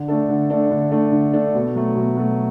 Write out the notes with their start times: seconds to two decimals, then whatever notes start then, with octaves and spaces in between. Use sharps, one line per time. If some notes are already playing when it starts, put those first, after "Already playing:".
Already playing: D3
0.08 A3 D4 A4
0.29 D3
0.50 A3 D4 A4
0.71 D3
0.92 A3 D4 A4
1.12 D3
1.33 A3 D4 A4
1.54 B2
1.75 F#3 A3
1.96 B2
2.17 F#3 A3